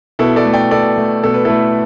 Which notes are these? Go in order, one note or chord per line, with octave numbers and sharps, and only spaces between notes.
B2 E4 A4
A4 D5
A3
D5 G5
B2 A4 D5
A3
B2 A4
B4
A3 E4 A4